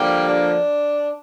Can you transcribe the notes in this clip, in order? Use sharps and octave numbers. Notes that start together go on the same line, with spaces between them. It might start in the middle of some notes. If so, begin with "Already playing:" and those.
Already playing: D3 F3 G3 A#3 G4
D4